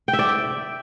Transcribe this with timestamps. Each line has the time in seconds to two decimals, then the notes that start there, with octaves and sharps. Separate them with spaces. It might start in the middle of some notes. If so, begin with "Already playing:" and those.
0.08 G5
0.13 E5
0.19 D5